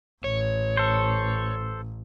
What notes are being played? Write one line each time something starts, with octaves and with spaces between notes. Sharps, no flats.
A1 C#5
A4 C5